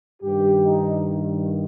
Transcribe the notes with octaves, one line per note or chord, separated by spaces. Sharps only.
G2 D#3 G4
D#4